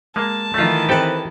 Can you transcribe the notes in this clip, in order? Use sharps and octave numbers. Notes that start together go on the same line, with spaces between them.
G#3 A#3 A5
D#3 E3 A3 F4
C4 G4 A4 B4 G5